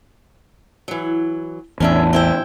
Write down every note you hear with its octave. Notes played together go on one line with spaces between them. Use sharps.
E3 F#3
A1 E2 C#4 D4 E5
C4 E4 G5